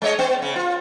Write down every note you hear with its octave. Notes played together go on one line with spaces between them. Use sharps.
G#3 C#5 D#5
B3
C#3
F4